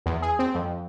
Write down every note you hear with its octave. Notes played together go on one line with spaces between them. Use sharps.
E2
G#4
C4
F2